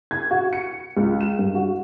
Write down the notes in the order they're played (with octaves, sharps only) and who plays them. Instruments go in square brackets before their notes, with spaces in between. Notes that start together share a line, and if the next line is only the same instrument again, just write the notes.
[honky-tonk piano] G#6
F#4
C#7
C#2
E7
G2
F#4